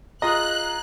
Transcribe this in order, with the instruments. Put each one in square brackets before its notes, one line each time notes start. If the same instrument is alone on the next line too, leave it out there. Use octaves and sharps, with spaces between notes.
[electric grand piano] F4 G#4 A#5 [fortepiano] D#5 [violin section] F#6